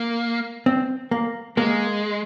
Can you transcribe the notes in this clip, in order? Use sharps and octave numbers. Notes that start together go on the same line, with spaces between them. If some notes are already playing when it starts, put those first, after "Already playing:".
Already playing: A#3
C4
A#3
G#3 A#3